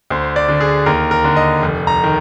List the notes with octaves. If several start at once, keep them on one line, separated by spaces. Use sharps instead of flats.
D2 C5
D5
D3
G#4
D#2 A#4
A#4
D3
D#5
F1
A#5
D#3